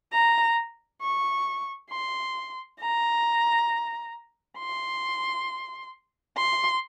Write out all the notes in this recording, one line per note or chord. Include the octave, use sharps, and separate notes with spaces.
A#5
C#6
C6
A#5
C6
C6